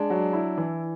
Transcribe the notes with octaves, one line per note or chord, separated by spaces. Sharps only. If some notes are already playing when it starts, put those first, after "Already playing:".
Already playing: G#3 D4
F#3
E4
E3